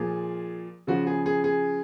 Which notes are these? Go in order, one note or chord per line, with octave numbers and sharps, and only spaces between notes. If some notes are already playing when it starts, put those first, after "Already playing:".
Already playing: A#2 F3 G#4
C#3 F3 F#4
G#4
G#4
G#4